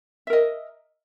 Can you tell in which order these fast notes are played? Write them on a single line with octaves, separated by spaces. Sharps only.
E5 A#4 D#5